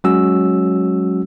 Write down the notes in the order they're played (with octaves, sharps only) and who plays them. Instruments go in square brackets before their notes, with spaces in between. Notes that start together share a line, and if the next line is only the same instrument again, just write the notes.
[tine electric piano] F#3 G#3 C#4 F#4 E6